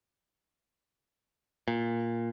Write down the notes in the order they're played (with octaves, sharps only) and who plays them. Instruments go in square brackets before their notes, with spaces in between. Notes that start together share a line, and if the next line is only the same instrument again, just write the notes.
[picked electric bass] A#2